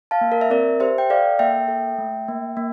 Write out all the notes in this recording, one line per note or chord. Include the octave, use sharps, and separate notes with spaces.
F5 A5
A#3
A#4
E5
C4 A#4 D5
G4 C5 E5
G5
A4 D5 F5
A#3 E5 G5
A4
A3
A#3
A#3